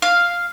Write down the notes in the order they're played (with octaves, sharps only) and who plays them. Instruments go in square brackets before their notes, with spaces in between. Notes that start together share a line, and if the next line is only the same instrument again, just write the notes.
[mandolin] F5